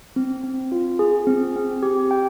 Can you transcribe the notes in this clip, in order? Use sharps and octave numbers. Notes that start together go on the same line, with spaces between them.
C4
C4
F4
G#4
C4
C4
G4
G5